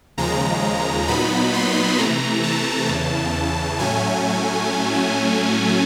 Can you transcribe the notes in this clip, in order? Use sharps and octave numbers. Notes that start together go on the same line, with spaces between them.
D#2 C#3 F3 G#3 A#5
A#2 F#3 B3 D#4 B5
C6
C3 E3 A3 A#5
A5
E2 C#3 E3
A2 F#3 A3 C#4 G#5